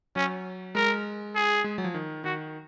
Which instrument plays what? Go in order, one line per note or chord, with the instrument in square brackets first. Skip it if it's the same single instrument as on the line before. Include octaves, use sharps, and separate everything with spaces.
[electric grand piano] F#3 [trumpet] C#4
[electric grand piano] G#3 [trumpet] A#4
[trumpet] G#4
[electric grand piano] G#3
F#3
F3
D#3
[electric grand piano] D#3 [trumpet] F#4